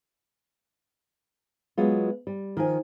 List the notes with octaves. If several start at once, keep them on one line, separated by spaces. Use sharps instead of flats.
F#3 G#3 B3 F4
G3
D#3 F3 G#5